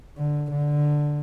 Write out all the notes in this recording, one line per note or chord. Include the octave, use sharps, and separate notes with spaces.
D3
D3